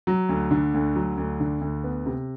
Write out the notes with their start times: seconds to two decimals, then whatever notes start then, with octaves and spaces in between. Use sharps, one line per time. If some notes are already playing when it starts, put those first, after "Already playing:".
0.07 F#3
0.29 D2
0.51 D3
0.74 D2
0.95 F#3
1.17 D2
1.40 D3
1.61 D2
1.84 B3
2.06 C3